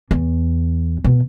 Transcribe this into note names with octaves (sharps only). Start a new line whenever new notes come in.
E2
B2